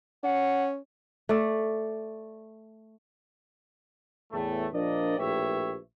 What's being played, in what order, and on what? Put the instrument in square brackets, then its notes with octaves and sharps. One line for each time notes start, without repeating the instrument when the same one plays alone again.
[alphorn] C#4 [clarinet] F#5
[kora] A3 D5
[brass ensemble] E2 A2 A3
A#1 F3 D4 A#4 D5 D#5
A#1 A2 G4 B4 C#5 E5